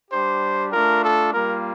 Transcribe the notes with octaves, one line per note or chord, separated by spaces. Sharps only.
G3 D4 G4 C5
A3 D4 F4 A#4
A4
G3 A#3 F4 A#4